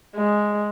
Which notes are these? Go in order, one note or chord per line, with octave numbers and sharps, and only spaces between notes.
G#3